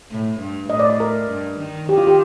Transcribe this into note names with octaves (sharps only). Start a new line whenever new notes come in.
A2
G2
A2 D#5
D5
D5
A#4
G2
D#3
D#3 G4
F4
G4